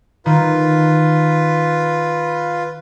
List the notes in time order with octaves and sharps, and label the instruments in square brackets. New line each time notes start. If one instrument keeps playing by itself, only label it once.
[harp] D#3 [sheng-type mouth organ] F4 B4